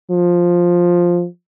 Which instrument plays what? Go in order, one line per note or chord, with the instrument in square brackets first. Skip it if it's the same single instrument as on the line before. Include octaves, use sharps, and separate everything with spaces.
[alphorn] F3